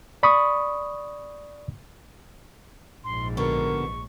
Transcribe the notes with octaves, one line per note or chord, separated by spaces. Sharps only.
D5 B5 C#6 D#6
A#1 G#2 C6
B2 D3 B3 A#4 C#6